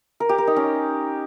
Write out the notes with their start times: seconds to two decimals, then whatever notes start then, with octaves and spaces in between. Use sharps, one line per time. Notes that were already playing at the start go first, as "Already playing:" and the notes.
0.20 A#4
0.29 G4
0.38 A#4
0.47 D#4
0.56 C#4